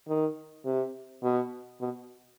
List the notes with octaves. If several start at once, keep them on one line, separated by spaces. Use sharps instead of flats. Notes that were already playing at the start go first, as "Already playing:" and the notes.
D#3
C3
B2
B2